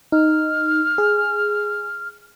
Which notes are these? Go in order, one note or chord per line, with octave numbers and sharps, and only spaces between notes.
D#4 F6
G#4